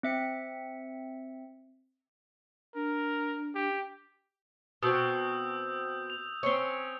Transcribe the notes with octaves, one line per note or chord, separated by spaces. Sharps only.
C4 E5 C#7
D4 A#4
G4
B2 C4 D#6 E6 G6
F7
C4 C#4